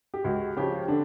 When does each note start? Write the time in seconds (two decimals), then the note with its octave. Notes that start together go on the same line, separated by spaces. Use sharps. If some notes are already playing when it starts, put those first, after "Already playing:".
0.14 G4
0.24 C#2 F#4
0.57 C#3 F3 G4
0.88 D3 D4